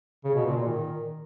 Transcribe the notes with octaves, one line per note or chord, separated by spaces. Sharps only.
C#3
B2
A#2
A#2
D#3